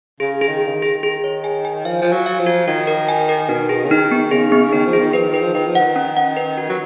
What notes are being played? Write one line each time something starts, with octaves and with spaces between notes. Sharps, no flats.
C#3 G#4
G#4
D#3
G#4
C#3
D#3
G#4
G#4
C#5
G#5
G#5
F3 F5
F3 G#5
F#3
F5
F3
F#4
D#3 F#4
A#4
G#5
A#4
B2 D#4
G#4
C#3
D#3 D#4
B3
C#3 G#4
B3
D#3 D#4
F3
G#4
D#3
F3 B4
D#3
B4
F3
D#3 B4
F3
D#3 F#5
C#4
F#5
B4
F#4
F#3